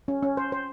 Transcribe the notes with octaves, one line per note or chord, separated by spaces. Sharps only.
C#4
C#4
C5
C5